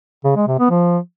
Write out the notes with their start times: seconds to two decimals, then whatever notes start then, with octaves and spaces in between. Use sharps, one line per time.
0.25 C#3
0.36 G#3
0.48 C3
0.59 B3
0.70 F3